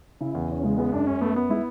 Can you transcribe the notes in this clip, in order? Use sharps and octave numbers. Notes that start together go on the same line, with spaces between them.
C#3 E4
E2
E2 C#4
C#3 G#3
G#3 B3
F#2 D4
F#2 C#4
A3 B3
B3
G#3 E4